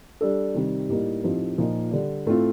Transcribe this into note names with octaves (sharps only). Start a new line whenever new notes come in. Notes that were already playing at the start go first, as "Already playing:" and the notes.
G3 D4 A4
C3 D#3 G3
A2 G3 A#3 D#4
A2 F3 C4 D#4 G4
A#2 F3 A#3 D#4
D3 G3 D4
A2 A3 C4 F4